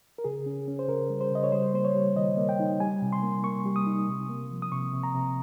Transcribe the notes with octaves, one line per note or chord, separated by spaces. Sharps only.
A#4
C#3 G#4
C#4
C#4
C5
C#3 A#4
G3
C5
C#3 D#5
C#5
G3 C5
A#3 C5
C#5
G3
D#3 D#5
A#3
G5
D#4
G3 G#5
C3
C6
A#3
A#3 C#6
G3
D#6
D#4
C3
A#3
F3
D#6
C3 C#6
C3
A#5
C3